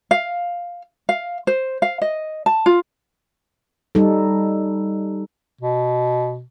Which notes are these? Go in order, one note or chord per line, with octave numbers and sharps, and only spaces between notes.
F5
F5
C5
F5
D#5
A5
F4
G3 D#4 A4
B2